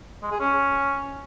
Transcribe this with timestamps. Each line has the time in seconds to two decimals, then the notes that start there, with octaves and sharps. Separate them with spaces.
0.23 G#3
0.31 G#4
0.40 C#4